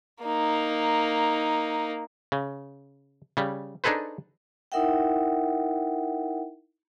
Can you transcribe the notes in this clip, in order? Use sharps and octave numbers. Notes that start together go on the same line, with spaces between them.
A#3 D#4
C#3
C#3 G3
D4 D#4 G#4 A4 B4 C5
D#4 E4 A#4 E5 F#5 G5